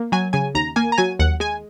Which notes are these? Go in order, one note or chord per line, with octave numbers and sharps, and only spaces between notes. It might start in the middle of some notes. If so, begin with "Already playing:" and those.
Already playing: A#3
F#3 G#5
C#3 G#5
D#2 A#5
A#3 G#5
A#5
F#3 G#5
D#2 F#5
G#3 G#5